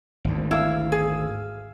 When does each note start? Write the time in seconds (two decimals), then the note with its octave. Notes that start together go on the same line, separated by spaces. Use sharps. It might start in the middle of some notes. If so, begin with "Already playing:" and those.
0.24 G#1 D2
0.51 E4 F5 E6
0.92 G#4